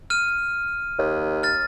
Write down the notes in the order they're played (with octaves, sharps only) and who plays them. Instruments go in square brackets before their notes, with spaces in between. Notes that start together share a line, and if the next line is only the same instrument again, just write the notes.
[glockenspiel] F6 D#7
[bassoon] D#2
[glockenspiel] F6 A6